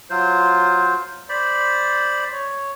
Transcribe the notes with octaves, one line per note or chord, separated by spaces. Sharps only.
F#3 F4 C5
C5 D5 B5
C#5